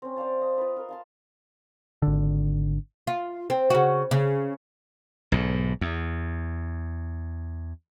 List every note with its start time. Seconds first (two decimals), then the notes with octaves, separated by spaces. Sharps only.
0.02 C4 C#4
0.16 C5 D5 F5 A5
0.40 C5 D#5 A5
0.58 F4 B4
0.76 F4 A#4 C6
0.89 F5 A5 C6
2.02 G#1 D3
3.07 F4
3.50 C4
3.70 C#3 F#4
4.11 C#3
5.32 B1 G#2
5.81 E2